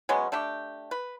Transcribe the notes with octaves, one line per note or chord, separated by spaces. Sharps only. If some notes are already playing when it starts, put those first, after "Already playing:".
F#3 G#3 B3 C#4
A3 D4 G4
B4